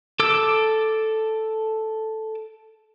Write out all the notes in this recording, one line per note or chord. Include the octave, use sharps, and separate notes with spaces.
A4 D6 E6